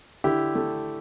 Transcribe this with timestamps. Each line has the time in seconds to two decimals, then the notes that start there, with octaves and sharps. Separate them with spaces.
0.24 D3 E4 G4
0.55 A3